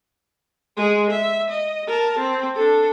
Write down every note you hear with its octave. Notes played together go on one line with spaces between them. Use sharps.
G#3 G#4
E5
D#5
A#4 A5
C4
D4 A4